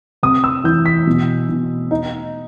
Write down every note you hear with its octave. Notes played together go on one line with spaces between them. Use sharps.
C3 D#6
E6
E3 G6
B6
B2
B2
D#4